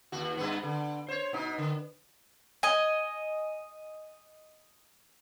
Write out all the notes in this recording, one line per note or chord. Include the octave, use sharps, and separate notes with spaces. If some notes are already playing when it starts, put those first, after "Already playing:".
D#2 F#4
G2 B3
D3
C5 C#5
B2 D#4
D3
D#5 G#5